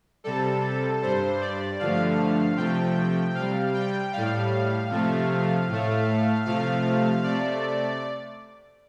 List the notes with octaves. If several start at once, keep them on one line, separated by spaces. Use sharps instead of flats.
C3 G3 A4
G2 G3 C5
D5
G2 D3 F3 A3 F5
C3 F3 A3 G5
C3 G3 F5
G5
A2 G3 F5
C3 F3 A3
A2 A3
C3 F3 A3 F5
C3 A3 D5